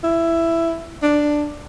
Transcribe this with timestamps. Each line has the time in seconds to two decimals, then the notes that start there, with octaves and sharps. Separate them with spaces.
0.04 E4
1.03 D4